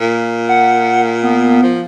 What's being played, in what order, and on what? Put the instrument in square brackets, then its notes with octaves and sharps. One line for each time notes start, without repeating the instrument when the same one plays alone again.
[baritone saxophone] A#2
[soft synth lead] F#5
B3
[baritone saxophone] F3